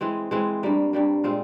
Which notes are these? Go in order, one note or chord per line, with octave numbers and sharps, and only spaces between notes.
E3 G#3 C4
E3 G#3 C4
G2 G3 A#3
G2 G3 A#3
A#2 G#3 C4 F4